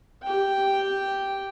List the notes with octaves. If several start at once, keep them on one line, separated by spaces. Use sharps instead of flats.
G4 G5